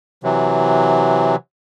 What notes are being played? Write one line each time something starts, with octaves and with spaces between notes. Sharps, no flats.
C3 E3 F#3